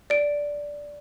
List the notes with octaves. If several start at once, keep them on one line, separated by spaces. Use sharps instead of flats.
D5 D7